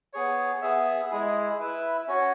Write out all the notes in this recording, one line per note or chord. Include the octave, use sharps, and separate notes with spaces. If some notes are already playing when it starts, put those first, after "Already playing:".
B3 G#4 C#5
B3 G#4 E5
G#3 E4 G#4
E4 B4 E5
C#4 F#4 C#5